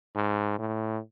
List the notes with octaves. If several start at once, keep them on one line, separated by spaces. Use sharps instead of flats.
G#2
A2